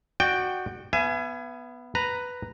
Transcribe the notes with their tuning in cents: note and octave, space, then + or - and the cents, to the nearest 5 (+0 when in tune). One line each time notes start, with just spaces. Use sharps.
F#4 +0 D5 +35 G5 +0
B3 +0 E5 +40 G#5 +10
B4 +0 A#5 +0